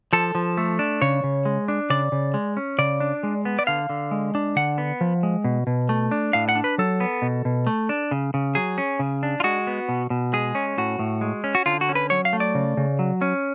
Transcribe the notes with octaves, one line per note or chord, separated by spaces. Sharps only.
F3 A4
F3
A3
D4
C#3 C#5
C#3
G#3
D4
C#3 D5
C#3
G#3
C#4
C#3 D5
D4
G#3
B3
D5
D3 F5
D3
G#3
D4
D3 F#5
B3
F3
G#3
B2
B2
A3
D4
A2 F5
F#5
D4
B4
F#3 A4
B3
B2
B2
A3
D4
C#3
C#3
F#3 G#4
C#4
C#3
D4
F4
G#3 F#4
B3
B2
B2
G#3 G#4
C#4
A2 F#4
A2
G#3
C#4
F#4
D3 F4
F#4
C#4
B4
F#3 C#5
F5
A3
D5
C#3
C#3
F#3
C#4